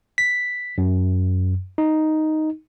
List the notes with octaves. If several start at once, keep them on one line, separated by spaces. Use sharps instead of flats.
B6
F#2
D#4